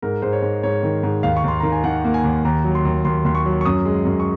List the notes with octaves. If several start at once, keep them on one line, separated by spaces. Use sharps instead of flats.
G#2 A#4
G#2 C5
C#5
G#2
G#2 C#5
D#3
G#2
D#2 F5
C#6
D#2 C6
D#3 A#5
G#5
D#3 F#5
A#3
G#5
D#2
D#2 A#5
F#3
C6
D#2
D#2 C6
D#2 C6
C#6
F#3
C#6
F#2 D#6
G#3
F#2
C#6